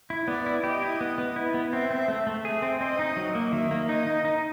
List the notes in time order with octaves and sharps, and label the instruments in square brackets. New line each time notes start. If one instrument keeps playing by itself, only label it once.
[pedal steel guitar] E4
[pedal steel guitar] B3 [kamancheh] D5
[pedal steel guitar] E4
[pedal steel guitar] G4 [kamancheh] D#5
[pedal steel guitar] E4
B3
B3
E4
B3
[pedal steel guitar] C4 [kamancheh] E5
[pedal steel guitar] C4
A3
A3
[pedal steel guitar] G#4 [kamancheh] E5
[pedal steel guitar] C4
[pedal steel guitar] C4 [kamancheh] D#5
[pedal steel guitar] D#4
F#3
A#3
[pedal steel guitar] D#3 [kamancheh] E5
[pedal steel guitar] A#3
[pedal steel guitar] D#4 [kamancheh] D#5
[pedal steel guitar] D#4
D#4